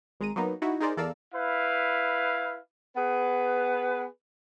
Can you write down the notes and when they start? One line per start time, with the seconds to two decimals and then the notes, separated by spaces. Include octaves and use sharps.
0.20 G#1 G#3 A#5 D#7
0.36 F#3 A#3 B3 D#4
0.62 D#4 E4 F#4
0.80 D#4 G#4 A#4 C5 D5
0.97 E2 A4 A#4 D5 F5 E6
1.33 E4 B4 F5
2.97 B3 G#4 B4